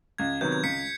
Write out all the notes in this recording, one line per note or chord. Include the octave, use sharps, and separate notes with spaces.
C#2 G#6
C3 D#3 F#3 B3 G6
G#6
C#2 B6 C#7